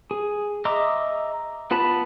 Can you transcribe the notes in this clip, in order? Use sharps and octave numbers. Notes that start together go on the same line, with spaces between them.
G#4
D#5 E5 A#5 C6 D6
B3 F4 B4 A5 B5